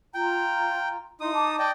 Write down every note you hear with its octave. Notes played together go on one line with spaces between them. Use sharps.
F4 G5 A#5
D#4 E4 C6 D#6
A5 D6
D5 D#5 G5